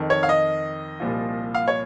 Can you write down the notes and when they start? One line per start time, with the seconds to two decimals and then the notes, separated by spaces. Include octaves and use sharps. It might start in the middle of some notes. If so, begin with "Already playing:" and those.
Already playing: F2 D#3
0.10 C#5
0.23 F5
0.29 D#5
1.00 C2 A#2 F3
1.54 F5
1.68 C#5